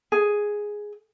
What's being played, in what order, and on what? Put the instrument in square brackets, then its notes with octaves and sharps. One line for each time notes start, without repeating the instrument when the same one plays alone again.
[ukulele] G#4